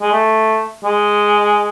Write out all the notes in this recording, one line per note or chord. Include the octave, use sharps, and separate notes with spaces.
G#3
A3
G#3